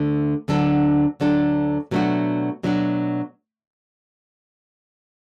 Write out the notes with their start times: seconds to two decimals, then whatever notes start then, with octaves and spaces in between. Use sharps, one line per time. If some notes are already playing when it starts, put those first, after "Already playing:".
Already playing: D2 D3 A3
0.48 D2 D3 F#3 D4 A4
1.20 D2 D3 F#3 D4 A4
1.91 B2 F#3 A3 D4 F#4
2.63 B2 F#3 A3 D4 F#4